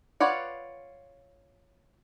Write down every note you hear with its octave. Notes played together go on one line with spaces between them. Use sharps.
F4 B4 C#5 D5 F#5